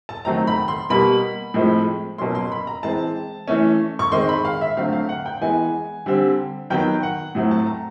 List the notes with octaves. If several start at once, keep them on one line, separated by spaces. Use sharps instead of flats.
A5
D#3 F#3 A3 C4 A#5
B5
C6
B2 G3 A#3 B5
A2 F3 G#3 C4
B2 F#3 A#3 C#4 C6
C6
B5
A#5
E3 G#3 C4 A5
E3 A3 C#4
C#6
D#3 G#3 C4 C6
B5
F5
E5
D3 F#3 A3 C4 F5
F5
F#5
G5
E3 G#3 B3 G#5
D3 G3 C4
D#3 F#3 B3 G5
F#5
A2 F#3 A3 C4
A5
A#5